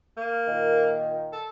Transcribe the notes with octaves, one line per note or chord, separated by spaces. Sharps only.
A#3
A#2 D#3
A4